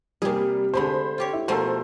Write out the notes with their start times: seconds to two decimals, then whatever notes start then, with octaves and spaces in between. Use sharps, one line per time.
0.22 C3 G3 A#3 G#4
0.74 D3 G#3 A3 C5 B5
1.18 F4 G4 C#5
1.33 E4
1.48 B2 F3 A3 A4 A#4 C5